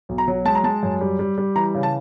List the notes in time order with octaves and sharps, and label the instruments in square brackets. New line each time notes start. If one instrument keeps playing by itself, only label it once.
[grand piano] B1
A#5
F#3
G#3 A5
A#5
G#3 A5
F#2
G3
G3
G3
E3 A#5
C#3
A5